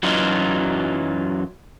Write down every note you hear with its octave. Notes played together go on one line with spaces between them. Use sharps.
F#2 E3 F#3 D#4 F4